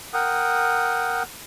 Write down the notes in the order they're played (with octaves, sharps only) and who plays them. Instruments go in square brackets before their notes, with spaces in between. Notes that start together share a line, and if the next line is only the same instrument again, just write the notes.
[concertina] A#4 F#5 G5 D#6